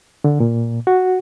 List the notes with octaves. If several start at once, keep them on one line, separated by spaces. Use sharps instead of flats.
D3
A#2
F#4